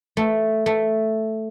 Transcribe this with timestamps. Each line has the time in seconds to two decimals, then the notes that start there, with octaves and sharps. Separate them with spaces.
0.17 A3
0.66 A3